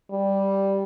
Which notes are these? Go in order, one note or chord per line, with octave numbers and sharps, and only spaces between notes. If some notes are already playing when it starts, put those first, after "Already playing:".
G3